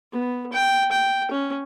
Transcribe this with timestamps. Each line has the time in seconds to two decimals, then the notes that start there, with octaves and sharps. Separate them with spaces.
0.12 B3
0.53 G5
0.92 G5
1.31 C#4